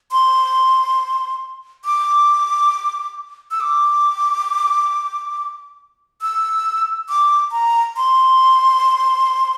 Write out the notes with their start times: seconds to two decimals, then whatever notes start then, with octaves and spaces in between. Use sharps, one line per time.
0.11 C6
1.85 D6
3.51 E6
3.60 D6
6.21 E6
7.09 D6
7.52 A#5
7.97 C6